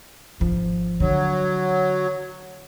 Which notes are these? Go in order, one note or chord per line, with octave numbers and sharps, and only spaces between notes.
G#1 F3
D3 F#3